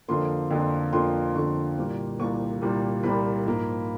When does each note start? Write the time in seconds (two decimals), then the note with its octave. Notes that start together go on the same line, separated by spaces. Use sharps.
0.08 F2 D3 F3 A#3 C6
0.50 F2 D3 F3 A#3
0.93 F2 D3 F3 A#3 C6
1.35 F2 D3 F3 A#3 C#6
1.77 C2 A#2 G3 A#3
2.19 C2 A#2 G3 A#3 C#6
2.62 C2 A#2 G3 A#3
3.03 C2 A#2 G3 A#3 B5
3.46 G#2 F3 A#3